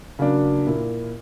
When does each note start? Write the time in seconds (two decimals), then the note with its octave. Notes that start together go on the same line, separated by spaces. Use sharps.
0.19 C#3 F#3 A#3 D4
0.66 A#2 A#3 E4